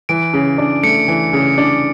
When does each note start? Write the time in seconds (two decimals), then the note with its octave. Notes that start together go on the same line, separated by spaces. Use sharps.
0.09 E3 D7
0.34 C#3
0.58 D4
0.83 A3 C#7
1.08 E3
1.33 C#3
1.58 D4